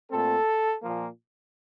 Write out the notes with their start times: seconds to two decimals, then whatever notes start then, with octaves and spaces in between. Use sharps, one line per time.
0.11 A#2 A3 C4 A4
0.82 A#2 F3 A#3